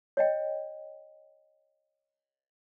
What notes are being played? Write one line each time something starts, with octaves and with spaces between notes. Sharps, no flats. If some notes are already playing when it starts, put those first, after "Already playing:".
C#5 D#5 G5